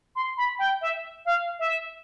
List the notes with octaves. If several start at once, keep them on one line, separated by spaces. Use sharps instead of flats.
C6
B5
G5
E5
F5
E5